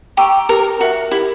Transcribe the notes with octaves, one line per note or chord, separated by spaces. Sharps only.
G4 G5 A#5 C#6 E6
G4 A#4
F#4 A#4 E5
E4 G4